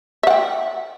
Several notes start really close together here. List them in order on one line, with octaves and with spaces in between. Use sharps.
E5 F#5 G5